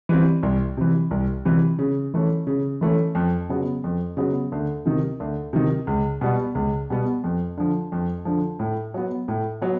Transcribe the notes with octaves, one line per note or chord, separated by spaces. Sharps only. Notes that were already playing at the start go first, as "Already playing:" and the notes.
E3 G3 C4
C2
C3 E3
C2
C3 E3
C#3
E3 A3 C#4
C#3
E3 A3 C#4
F2
C#3 F#3 B3
F2
C#3 F#3 B3
D2
C3 D#3
D2
C3 D#3
C#2
B2 G3 B3
C#2
B2 G3 B3
F2
D3 F3
F2
D3 F3
A2
F#3 B3
A2
F#3 B3